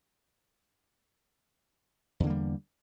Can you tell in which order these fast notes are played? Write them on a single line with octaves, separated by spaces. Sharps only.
E2 D3 A#3 G3